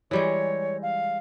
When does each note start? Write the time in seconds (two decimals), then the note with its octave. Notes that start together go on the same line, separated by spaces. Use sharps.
0.11 E3 G3 G#3 C#5
0.82 F5